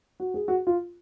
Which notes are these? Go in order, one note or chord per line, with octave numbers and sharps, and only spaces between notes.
F#4
G#4
F#4
F4